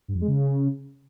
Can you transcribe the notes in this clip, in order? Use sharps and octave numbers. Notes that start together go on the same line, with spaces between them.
G2
F2
G#3
C#3